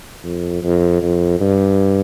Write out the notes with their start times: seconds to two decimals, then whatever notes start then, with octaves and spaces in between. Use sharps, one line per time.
0.24 F2
0.63 F2
1.02 F2
1.40 G2